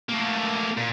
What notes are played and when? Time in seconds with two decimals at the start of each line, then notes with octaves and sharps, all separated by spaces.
0.09 A3 A#3
0.77 A#2